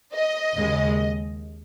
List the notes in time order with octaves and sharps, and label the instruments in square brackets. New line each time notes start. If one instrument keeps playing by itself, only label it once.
[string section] D#5
D#2 C#3 G#3